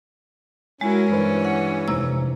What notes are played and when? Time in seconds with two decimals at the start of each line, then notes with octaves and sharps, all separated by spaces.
0.81 G#3 C#4 E4 F#4 A#4
1.12 G2 E3 B4 C5
1.45 F#5
1.88 F1 C3 A#5 E6